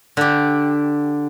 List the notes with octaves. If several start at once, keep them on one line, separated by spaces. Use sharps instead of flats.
D3 G4